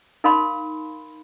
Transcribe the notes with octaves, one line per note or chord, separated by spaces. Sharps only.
D#4 A#4 F5 A5 B5 C6